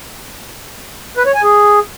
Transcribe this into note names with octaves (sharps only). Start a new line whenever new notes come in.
B4
C#5
G#5
G#4